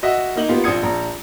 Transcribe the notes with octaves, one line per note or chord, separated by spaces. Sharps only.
F#4 D#5 E5 F#5
A#3 D#4 F#7
A#3 B3 F4 G4
A#1 C4 F4 D#6 G#6 C#7
A#1 A#5